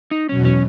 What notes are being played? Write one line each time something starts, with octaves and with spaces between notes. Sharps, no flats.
D#4
E2 B2 F#3 C#4
C#4